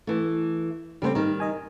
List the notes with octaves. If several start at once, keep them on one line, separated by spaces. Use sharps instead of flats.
E3 A3
C#3 G3 B3 C4 A4 C5
D#3 G3 D#4 A#4
A#4 D#5 G#5